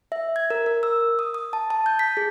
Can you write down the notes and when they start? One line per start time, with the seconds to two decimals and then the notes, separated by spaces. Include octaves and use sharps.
0.12 E5
0.36 G#6
0.50 A#4
0.66 A#4
0.83 E6
1.19 D#6
1.34 D#6
1.53 A5
1.70 A5
1.86 G6
1.99 B6
2.17 G#4